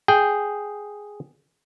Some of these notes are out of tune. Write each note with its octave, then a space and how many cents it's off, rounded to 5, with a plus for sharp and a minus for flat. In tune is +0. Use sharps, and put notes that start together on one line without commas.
G#4 +0 G5 +0